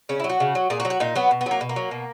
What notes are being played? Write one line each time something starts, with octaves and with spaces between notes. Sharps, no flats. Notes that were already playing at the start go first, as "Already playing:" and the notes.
C#3 C#4
E4
F#3
F#4
C#3
F#3
A#2 G#4
F#4
F#3
F#4
A#2 D#4
F#3 B3
B2
B3
F#3
A#3
B2
A#3
F#3
B2